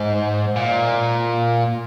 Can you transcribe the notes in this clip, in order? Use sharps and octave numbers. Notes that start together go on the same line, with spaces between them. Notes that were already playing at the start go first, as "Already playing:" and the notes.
Already playing: G#2
A#2